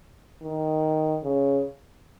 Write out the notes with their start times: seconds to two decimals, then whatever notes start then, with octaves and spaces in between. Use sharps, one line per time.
0.42 D#3
1.24 C#3